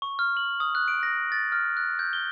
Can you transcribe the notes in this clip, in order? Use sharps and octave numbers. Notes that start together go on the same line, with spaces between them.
C#6
F6
F#7
D#6
F#6
D7
A#6
A6
F6
F#6
G6
G7